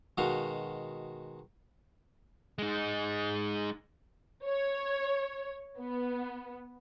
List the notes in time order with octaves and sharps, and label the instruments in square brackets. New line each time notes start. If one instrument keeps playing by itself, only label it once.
[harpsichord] B2 D#3 G#3 F#4 F5
[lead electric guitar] G#3 D#4
[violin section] C#5
B3